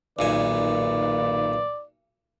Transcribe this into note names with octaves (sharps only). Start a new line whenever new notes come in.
B1 A#2 D#3 A#3 B4 D5 G#5